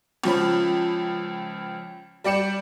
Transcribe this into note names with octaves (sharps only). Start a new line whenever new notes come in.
C#2 F3 C#4 B5
G3 D5 G5 C#7 E7